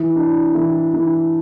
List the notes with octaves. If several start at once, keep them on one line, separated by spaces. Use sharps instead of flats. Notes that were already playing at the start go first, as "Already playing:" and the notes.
Already playing: E3
D4
E3
E3